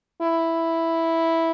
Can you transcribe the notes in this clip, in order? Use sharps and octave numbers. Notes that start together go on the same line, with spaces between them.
E4